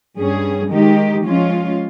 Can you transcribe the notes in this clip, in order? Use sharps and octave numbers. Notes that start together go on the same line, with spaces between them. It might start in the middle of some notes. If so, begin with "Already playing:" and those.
G2 G3 C#4 G#4
D#3 G#3 D#4 G4
F3 G#3 C#4 F4